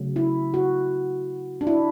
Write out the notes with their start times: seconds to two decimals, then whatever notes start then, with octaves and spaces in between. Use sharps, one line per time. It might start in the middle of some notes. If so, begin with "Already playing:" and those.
Already playing: C#3 F#3 A3
0.16 E4
0.54 F#4
1.61 D4
1.67 E4